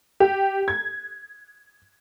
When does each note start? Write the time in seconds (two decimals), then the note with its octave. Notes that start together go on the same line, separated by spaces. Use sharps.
0.20 G4
0.68 G#6